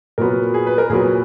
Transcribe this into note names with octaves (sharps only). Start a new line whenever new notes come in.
A#2 F#3 B3 A#4
G#4
B4
A#4
A#2 F#3 B3 G#4